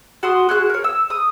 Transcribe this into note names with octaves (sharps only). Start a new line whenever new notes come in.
F#4 C6 D#6
F#4 G#4 F#6
A#4 C#5
E6
D#6